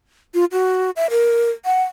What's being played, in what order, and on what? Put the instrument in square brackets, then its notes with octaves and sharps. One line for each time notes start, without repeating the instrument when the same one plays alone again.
[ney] F4
F#4
E5
A#4
F#5